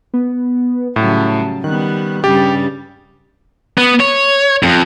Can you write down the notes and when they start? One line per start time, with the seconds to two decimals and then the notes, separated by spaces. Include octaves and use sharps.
0.14 B3
0.96 A2 C#3 F#3 G3 A5
1.64 D#3 G3 B3 F#6
2.24 G2 C#3 G3 G4 A6
3.78 B3
4.00 C#5
4.63 F2